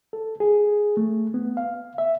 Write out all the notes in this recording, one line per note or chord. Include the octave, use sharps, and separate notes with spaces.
A4
G#4
A3
B3
F5
E5